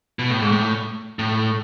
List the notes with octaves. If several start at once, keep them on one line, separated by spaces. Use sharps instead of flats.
B2
A2
G#2
A2
A2